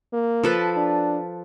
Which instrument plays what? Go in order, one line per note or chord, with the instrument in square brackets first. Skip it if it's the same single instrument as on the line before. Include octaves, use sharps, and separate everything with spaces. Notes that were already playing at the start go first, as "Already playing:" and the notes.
[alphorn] A#3
[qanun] F3 A4 B4
[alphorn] D4